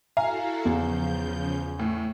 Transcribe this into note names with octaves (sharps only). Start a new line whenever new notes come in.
E4 F#4 A4 F5 G#5 A#5
E2 C#3 F3 G6
A2